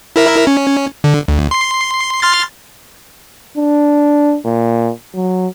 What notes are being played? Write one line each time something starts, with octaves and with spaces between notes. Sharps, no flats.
E4 A#4 E5
C#4
D3
D2
C6 C7
C6 F6 A6
D4
A#2
F#3